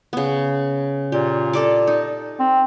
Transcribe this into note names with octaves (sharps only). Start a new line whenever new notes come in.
C#3 B3
A#2 G4
A4 D5 D6
D#4
C4